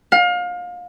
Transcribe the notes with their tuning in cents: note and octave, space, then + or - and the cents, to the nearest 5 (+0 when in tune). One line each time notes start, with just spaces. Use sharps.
F5 +30